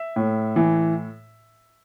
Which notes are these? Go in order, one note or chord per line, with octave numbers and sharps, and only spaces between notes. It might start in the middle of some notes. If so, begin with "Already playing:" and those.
Already playing: E5
A2
E3